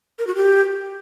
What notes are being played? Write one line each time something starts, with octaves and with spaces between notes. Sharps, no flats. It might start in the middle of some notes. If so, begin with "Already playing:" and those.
A#4
F#4
G4